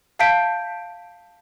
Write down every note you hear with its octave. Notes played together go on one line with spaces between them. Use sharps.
E5 F5 A5 G6 B6 D7